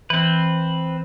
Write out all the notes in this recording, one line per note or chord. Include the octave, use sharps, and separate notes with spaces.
E3 C4 B4